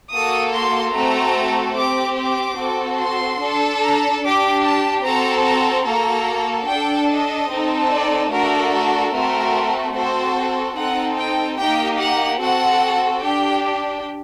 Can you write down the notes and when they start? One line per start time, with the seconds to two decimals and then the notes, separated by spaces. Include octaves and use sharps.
0.12 A#3 F#4 A4 D#6
0.52 C6
0.93 A3 C4 F#4 A4 A#5
1.75 C4 G4 D6
2.17 D6
2.58 C4 F#4 A4
2.98 C6
3.39 D4 A4
3.80 A#5
4.21 D4 G4 D6
4.63 A5
5.03 C4 F#4 A4 A#5
5.44 A#5
5.85 A#3 F#4 A4 A#5
6.67 D4 A4 G5
7.08 D#5
7.49 C4 D#4 A4
7.90 D5
8.30 A3 D4 F#4 A4 A#4
8.72 A#4
9.12 A3 C4 F#4 A4 A#4
9.94 C4 F#4 A4 C5
10.76 C4 D#4 A4 F#5
11.17 G5
11.58 A#3 D#4 G4 G5
11.99 F#5
12.40 C4 F#4 A4 F#5
13.22 D4 G4 G5